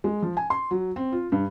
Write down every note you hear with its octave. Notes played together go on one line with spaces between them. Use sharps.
G#3
F3
G#5
C6
F#3
C4
F4
G2